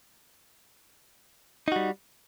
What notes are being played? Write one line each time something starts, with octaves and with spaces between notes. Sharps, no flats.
G3 D#4 F#4